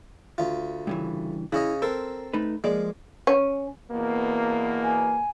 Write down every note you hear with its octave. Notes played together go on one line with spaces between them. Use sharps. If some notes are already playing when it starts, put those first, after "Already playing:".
D2 F4
G2 C#3 E3
C#3 C#4 E4 D#5
C4 A4 A#4 C6
A3 D#4 B4
F3 G#3 A#3 D5
C#4
E2 B2 A#3
G#5